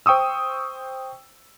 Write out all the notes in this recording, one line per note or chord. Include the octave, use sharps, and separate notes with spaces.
C5 G5 C#6 D#6 E6